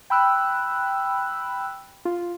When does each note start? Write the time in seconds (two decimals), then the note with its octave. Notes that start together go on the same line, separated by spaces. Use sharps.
0.10 G5 B5 E6 F#6
2.05 F4